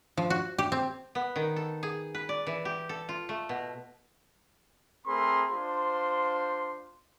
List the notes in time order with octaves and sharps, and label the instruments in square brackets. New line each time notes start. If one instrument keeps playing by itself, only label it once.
[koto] F3
F#4
G4
C4
B3
D#3
A4
G#4
B4
D5
E3
G4
A4
F4
A3
B2
[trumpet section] A3 C4 G#4 A#4 B5 C6
D4 F4 C5 C6